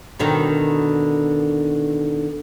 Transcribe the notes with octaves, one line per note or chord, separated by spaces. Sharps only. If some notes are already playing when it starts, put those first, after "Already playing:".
B2 D3 D#3